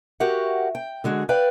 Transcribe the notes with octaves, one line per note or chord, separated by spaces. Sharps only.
F#4 G4 A#4 C#5 E5 F#5
G5
D3 G#3 F#4 G#4
B4 D5 F5 G5